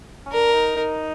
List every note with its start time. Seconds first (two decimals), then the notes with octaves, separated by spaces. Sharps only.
0.26 C#4
0.32 D4 A#4
0.54 D#4
0.76 D#4